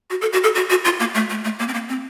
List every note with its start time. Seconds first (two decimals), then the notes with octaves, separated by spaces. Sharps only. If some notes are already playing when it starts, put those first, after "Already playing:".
0.10 F#4
0.21 A4
0.33 F#4
0.44 A4
0.55 F#4
0.70 F#4
0.85 F4
0.99 A#3
1.14 A3
1.30 A3
1.44 A3
1.59 A#3
1.68 C4
1.74 A#3
1.89 C4